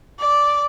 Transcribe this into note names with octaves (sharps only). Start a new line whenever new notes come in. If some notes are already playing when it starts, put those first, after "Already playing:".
D5